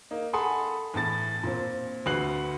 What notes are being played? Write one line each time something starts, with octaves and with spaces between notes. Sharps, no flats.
A#3 D#4
A4 F#5 G#5 B5 C6 D#6
E2 A2 A5 A6
A#2 C4
D2 F#4 B4 F#6 C7 F#7